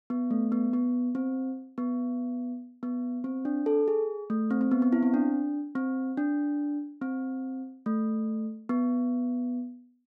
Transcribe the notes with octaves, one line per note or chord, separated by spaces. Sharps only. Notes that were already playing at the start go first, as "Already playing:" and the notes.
B3
A3
B3
B3
C4
B3
B3
C4
D4
A4
G#4
A3
C4
C4
B3
B3
E4
C4
D4
C4
D4
C4
A3
B3